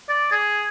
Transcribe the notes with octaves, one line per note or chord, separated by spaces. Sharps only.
D5
G#4